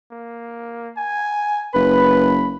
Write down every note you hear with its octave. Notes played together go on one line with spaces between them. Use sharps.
A#3
G#5
F#1 B4 B5